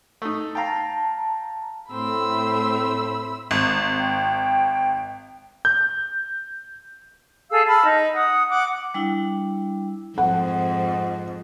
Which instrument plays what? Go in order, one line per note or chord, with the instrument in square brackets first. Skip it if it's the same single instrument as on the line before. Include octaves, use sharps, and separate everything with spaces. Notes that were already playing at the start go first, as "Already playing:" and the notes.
[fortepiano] A3 D#4
[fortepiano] F5 G5 [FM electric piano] A5 A#5
[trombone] A2 [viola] A3 C4 [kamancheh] B5 E6
[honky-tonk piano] G#1
[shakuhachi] G5
[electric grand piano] G6
[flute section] G#4 A4 F5 E6
A5 B5 E6 F6
D#4
F#5 D#6
F#5 D6
[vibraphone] G3 D4 E4
[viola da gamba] F2 G#2 [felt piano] F#5